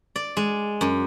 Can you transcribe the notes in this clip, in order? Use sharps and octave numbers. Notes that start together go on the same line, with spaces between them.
D5
G#3
F#2